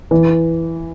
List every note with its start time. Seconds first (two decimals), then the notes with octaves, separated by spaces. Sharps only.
0.11 E3